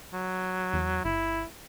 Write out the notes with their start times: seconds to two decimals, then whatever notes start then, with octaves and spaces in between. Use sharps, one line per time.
0.13 F#3
0.73 E2
1.05 G1 E4